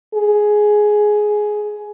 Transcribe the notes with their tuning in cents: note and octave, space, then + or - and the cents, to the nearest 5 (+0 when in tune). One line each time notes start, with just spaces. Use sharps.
G#4 +10